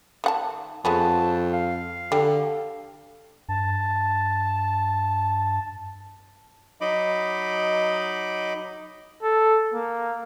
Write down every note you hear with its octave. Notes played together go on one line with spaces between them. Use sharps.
D#3 F#5 A5
F2 G#3 B3 C#4 A5
F5
D3 G3
G2 A5
F#3 D#4 D#5 B5 D6
A4
A#3